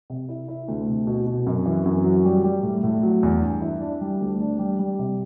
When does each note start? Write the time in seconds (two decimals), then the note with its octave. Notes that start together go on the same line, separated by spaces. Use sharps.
0.10 C3
0.29 E4
0.48 E4
0.68 D2
0.87 C3
1.07 B2
1.26 B2
1.46 F#2
1.66 E3
1.86 F#2
2.04 F#3
2.25 G3
2.44 G3
2.63 A2
2.84 A2
3.03 F#3
3.23 E2
3.41 G2
3.62 E4
3.81 D4
4.01 G3
4.21 D2
4.40 D4
4.59 G3
4.79 G3
4.99 C3